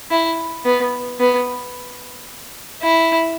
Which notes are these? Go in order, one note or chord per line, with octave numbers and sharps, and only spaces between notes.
E4
B3
B3
E4